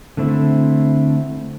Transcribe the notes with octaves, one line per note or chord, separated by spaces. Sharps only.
D3 A3 C4 E4